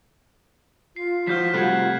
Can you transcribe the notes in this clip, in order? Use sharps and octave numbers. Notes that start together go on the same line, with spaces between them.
F4 C7
F3 F#4 C5 F6 G6 B6
C3 G3 A3 C5 F#5 F#6 G#6